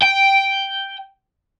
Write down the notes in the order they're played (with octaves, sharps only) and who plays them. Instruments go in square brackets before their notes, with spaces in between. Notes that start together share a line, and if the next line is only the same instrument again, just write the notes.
[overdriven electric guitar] G5